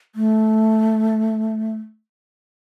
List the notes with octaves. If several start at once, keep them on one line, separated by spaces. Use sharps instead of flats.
A3